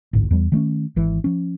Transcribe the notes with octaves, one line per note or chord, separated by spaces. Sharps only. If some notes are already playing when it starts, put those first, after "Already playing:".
A1 D2 G#2
E2 G3
D#3 A3 A#3 C#4
G#1 E3
F3 C#4